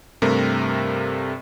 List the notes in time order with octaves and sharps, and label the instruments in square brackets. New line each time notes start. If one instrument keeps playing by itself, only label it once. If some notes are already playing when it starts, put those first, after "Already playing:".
[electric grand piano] G2 C3 A3 A#4